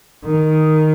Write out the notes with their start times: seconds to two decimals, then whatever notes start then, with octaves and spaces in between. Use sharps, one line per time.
0.25 D#3